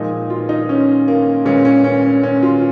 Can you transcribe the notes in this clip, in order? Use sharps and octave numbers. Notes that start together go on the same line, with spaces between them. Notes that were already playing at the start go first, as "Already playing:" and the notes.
Already playing: A#2 F3 G#3 D#4
F4
D#4
C#4
A#3
A#2 G#3 C#4
C#4
C#4
C#4
C#4
F4